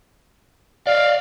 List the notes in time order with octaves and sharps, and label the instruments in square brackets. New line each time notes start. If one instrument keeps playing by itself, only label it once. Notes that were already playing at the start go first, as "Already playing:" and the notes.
[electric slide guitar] C#5 D5 [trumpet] F5